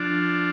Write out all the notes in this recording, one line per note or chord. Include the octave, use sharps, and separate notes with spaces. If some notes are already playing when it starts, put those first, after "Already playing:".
Already playing: F3 D4